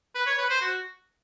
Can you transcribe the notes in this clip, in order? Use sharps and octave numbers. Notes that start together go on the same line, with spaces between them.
B4
C#5
B4
C5
F#4